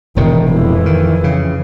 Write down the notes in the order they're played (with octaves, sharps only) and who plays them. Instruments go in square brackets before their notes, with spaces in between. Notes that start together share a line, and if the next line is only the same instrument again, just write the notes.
[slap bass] E1 A2 C3 [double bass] D#3
[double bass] F2 E3
[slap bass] D#3
C#3